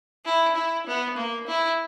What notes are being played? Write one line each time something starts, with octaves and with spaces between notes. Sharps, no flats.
E4
E4
B3
A#3
E4